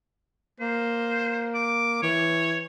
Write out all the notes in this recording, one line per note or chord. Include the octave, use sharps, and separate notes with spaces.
A#3 C5
D6
E3 C#5